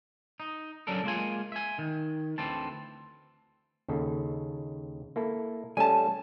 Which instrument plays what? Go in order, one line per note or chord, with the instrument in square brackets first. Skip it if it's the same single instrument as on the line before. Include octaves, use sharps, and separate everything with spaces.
[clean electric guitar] D#4
F#3 C#4 D4 A4 A#4
G#3 A#3 F4 G#5
E5 G#5
D#3
D2 E3 C4 A5
[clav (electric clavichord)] D#2 C#3 A4
A#3 E4 A4
[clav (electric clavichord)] G3 A3 C#4 [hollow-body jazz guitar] G#5 A5